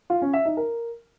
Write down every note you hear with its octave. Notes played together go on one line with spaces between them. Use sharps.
F4
C#4
E5
D#4
A#4